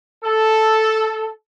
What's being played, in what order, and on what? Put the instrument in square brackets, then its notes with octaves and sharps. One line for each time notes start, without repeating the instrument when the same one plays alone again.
[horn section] A4